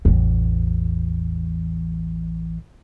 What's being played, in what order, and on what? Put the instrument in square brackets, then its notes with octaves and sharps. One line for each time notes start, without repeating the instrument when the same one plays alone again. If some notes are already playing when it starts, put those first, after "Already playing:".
[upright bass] A1 E2